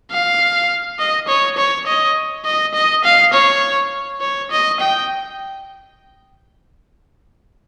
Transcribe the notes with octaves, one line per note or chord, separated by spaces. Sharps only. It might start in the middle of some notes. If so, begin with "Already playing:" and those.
F5
D#5
C#5
C#5
D#5
D#5
D#5
F5
C#5
C#5
D#5
G5